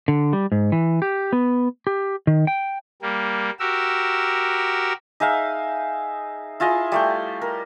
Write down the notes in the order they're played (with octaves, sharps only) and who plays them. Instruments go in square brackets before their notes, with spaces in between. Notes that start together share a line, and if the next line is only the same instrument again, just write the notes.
[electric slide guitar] D3
G3
G#2
E3
G4
B3
G4
D#3
G5
[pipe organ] G3 A#3
F#4 G4 A#4 E6
[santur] D#4 G#4 E5 F5
E4 F4 G#4 D#5
G3 A3 G5
A#4